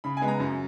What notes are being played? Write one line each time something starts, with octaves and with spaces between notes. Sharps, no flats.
C#3 B5
G#5
G#3 B3
A#5
F#2